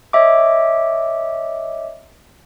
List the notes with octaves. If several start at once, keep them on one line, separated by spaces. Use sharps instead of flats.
C#5 D#5 E5 D6